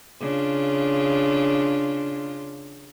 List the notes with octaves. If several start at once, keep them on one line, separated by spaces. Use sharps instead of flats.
C#3 D4 F4